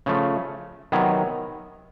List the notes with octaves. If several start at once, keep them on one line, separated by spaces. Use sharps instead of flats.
C#3 F3 A3
C3 D#3 F#3 B3